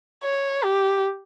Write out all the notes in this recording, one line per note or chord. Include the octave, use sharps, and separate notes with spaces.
C#5
G4